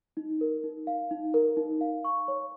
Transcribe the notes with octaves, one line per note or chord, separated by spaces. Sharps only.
D#4
A#4
D#4
F5
D#4
A#4
D#4
F5
C#6
C#5